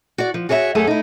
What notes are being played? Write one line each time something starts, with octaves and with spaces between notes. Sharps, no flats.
F#4 D5
F3
F#4 G#4 C#5 D5 E5
F#2 A3 G#4 A4
D#4 E4